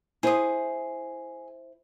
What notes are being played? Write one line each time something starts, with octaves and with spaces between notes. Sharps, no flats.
E4 G#4 C5 D#6